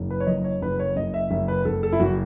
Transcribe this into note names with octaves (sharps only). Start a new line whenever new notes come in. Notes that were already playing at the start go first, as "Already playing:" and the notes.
Already playing: F#1
B4
C#5
F#2 D#5
C#5
F#1 B4
C#5
F#1 D#5
E5
F#1 E5
B4
F#1 A4
A4
E4
F#1 F#4